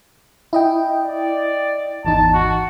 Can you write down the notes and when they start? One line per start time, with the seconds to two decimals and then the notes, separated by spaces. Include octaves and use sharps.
0.53 E4 D#5 G5
1.03 D5
2.05 G#1 E2 D#4 A5
2.34 F#4